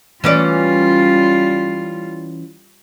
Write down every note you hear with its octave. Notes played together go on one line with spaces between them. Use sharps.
E3 G3 C#4 F4 D5